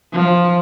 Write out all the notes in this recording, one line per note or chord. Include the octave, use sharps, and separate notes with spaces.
F3